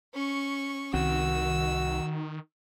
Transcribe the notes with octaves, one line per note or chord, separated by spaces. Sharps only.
C#4 C#6
C2 D#3 C4 F#4 E6